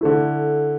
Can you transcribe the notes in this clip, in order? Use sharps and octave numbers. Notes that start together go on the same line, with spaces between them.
D3 A3 E4